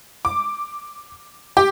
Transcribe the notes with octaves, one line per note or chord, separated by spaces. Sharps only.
D6
G4